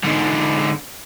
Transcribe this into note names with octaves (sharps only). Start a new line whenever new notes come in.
G#2 D3